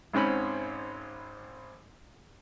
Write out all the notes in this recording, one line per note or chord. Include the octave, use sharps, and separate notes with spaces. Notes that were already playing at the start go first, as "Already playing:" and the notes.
G#1 G#2 C4 C#4 B5